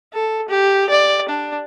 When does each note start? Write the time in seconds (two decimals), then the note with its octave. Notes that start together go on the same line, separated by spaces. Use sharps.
0.14 A4
0.49 G4
0.90 D5
1.29 D4